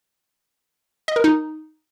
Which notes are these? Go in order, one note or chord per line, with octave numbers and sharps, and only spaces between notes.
D#5
A#4
D#4